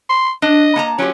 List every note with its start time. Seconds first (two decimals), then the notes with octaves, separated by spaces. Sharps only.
0.10 C6
0.42 D4 D#5
0.76 A#3 A5 A#5
0.99 F#3 C#4 F4 G4